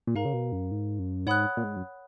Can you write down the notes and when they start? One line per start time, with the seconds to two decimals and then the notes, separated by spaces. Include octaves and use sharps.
0.07 A#2
0.15 G#2 A#4 F5 A#5
0.25 C#3
0.33 B2
0.52 F#2
0.71 G#2
0.99 F#2
1.26 G#2 C#5 F#5 B5 D#6 F#6
1.57 A#2
1.64 G#2
1.76 F#2